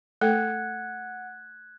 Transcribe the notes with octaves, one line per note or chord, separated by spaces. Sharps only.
A3 A4 F#5 G5 F#6 G#6